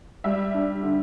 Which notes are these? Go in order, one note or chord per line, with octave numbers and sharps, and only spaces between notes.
G3 E5
D4
D3